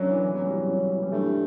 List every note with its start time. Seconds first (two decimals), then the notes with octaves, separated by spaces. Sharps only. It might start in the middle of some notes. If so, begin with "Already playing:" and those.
Already playing: F#2 F#3 C#4 D4
0.09 E3
0.23 E3
0.35 F#3
0.46 G3
0.58 F#3
0.69 F#3
0.80 F#3
0.91 E3
1.02 G3
1.12 G2 A3
1.23 G3